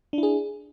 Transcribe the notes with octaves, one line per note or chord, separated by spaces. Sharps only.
D4 E4 G#4